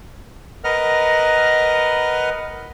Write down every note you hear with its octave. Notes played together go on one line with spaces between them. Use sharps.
A#4 B4 D#5 F#5 F6